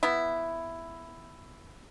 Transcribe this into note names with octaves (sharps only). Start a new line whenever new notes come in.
B3 E4